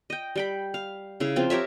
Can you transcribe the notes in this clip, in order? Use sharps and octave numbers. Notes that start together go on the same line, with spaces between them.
D#5 G5
G3 G5 B5
F5
C#3 E4 F5
F3 C4 F4
G4 A#4 C#5 E5